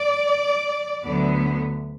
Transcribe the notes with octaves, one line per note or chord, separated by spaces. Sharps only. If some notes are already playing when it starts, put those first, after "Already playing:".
Already playing: D5
D2 D3 F#3 B3